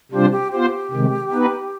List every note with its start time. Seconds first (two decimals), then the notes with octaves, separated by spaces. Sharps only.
0.12 C3 G3 D4 F4 G4 C5
0.32 G4
0.52 B3 F4 G4 C5
0.91 C3 D#3 G#3
1.32 B3 D#4 B4